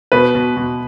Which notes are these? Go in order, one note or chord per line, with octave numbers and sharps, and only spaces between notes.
B2 B4
B2
B2